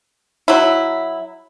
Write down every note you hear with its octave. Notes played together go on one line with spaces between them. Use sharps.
F#3 E4